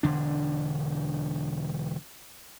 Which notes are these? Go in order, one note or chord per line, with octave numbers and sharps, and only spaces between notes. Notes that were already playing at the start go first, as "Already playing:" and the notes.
E1 D3 D4